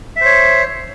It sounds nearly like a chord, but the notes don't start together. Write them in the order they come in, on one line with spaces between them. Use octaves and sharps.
E5 C5 C#5